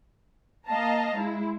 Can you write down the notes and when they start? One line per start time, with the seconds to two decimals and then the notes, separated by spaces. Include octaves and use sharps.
0.67 A#3 D#5 F5 A5 A#5
1.15 G#3 E4